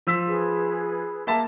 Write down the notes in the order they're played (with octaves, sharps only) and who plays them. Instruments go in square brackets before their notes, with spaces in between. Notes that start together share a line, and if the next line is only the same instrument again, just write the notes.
[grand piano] F3 E6 B6
[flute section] G#4 B4
[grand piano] A#3 E5 A5